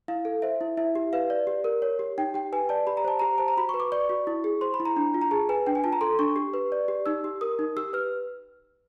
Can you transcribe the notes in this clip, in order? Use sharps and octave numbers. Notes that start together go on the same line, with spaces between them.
E4 F5
A4
C5 E5
E4
E4 E5
G4
B4 F5
D5
G4
A#4
C#5
G4
D#4 G5
G4 G5
B4 G#5
D5 A5
G4 B5
A#5
C5 A5
G4 A#5
C5 A5
A#5
F#4 B5
B4 C#6
D6
D5 C#6
F#4
E4
G#4
C5 C6
B5
E4
A#5
D4
F4
A#5
G#4 A5
B4 G#5
D4 G5
G#5
F4 A5
A#5
A4 C6
D4 C#6
G4
B4
D5
G4
D#4 E6
G4
A#4 D#6
D#4
G4 E6
B4 F6